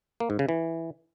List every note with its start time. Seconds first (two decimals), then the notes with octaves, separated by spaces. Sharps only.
0.20 A#3
0.30 G#2
0.39 C#3
0.49 E3